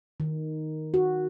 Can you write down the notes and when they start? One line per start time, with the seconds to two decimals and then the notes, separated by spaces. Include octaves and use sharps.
0.20 D#3
0.94 F#4